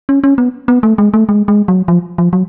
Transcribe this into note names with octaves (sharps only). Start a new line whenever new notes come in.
C#4
C#4
B3
B3
A3
G#3
A3
G#3
G#3
F#3
F3
F3
F#3